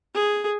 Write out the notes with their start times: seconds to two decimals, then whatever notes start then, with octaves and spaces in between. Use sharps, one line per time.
0.15 G#4